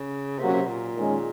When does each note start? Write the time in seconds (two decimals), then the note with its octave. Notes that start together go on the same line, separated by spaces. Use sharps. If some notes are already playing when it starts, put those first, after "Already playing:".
Already playing: C#3
0.39 C3 F#3 A#3 C#4 F#4
0.54 C3
0.67 A#2
0.95 D#3 G#3 C#4